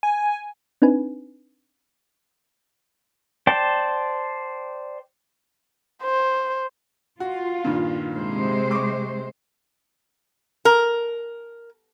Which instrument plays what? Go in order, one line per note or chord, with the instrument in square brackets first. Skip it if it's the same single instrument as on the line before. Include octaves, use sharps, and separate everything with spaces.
[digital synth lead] G#5
[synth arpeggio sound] C4 D4 D#4 B4 G#5
[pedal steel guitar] C5 D5 G5 A5
[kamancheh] C5
[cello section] F4 [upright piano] F#4
[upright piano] G2 A#2 D#3
[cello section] C3 G#3 C5
[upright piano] C#6 D6
[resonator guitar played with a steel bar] A#4